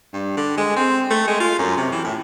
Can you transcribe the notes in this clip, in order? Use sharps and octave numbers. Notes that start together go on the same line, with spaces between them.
G2
D3
G#3
C4
A3
G#3
F4
F#2
C3
E3
A2